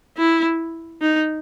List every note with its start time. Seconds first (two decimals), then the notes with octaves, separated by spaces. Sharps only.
0.18 E4
1.02 D#4